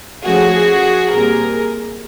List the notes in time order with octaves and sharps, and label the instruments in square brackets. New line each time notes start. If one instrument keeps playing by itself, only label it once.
[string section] F3 A3 C#4 F#4 G#4
A#2 G3 C4 G#4 A#4